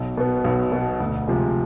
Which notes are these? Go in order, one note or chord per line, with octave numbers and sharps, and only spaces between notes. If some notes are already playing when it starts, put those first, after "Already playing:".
Already playing: B1
B2 B3
B1
B2 B3
D2
C3 F3 G#3